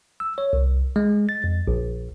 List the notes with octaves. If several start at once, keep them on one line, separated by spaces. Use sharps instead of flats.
E6
C#5
C2
G#3
A6
F2
A#1